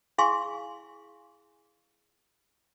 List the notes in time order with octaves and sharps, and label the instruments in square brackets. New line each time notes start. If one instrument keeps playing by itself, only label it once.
[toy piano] E4 G#4 F5 G#5 C6 C#6